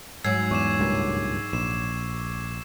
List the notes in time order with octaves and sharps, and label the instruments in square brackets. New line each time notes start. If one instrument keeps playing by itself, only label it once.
[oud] G#2 F#3 [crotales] E6 G#6 C7
[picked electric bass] E2 [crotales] C#6 D6 E7
[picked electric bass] C#2 G2 A#2
[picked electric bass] A#1 [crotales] E7